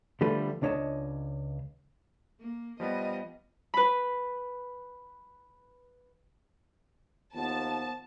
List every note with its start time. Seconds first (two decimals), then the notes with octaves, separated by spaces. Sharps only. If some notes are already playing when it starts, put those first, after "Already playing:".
0.21 D3 F3 G3 A3 A4 B4
0.62 C#2 D4 C#5 D#5 A5
2.40 A#3
2.80 F3 G3 B3 D#5
3.74 B4 B5
7.35 D#2 F3 B3 A5